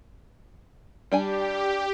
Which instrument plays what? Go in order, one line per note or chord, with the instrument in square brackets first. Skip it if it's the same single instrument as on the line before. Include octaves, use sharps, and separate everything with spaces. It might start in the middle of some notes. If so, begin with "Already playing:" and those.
[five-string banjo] G3 D4 G#5 [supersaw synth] G4